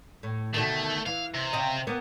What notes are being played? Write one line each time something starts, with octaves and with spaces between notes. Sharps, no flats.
A2
B2 D3 D#3 A3
E3 F5
C3
C#3 C4 D#5
A#3 B3 A#4